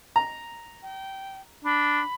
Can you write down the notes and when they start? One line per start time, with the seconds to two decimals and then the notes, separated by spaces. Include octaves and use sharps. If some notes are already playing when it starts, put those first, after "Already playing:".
0.16 A#5
0.83 G5
1.65 D4 B5